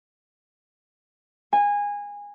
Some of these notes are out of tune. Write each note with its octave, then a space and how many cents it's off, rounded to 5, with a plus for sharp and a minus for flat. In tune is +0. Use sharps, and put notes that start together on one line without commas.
G#5 -20